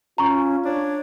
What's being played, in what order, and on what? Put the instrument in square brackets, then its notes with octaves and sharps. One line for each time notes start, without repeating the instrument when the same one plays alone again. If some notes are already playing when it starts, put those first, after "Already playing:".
[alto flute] C#4 [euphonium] F4 [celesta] A#5 C#6
[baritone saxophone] D4 [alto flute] C#5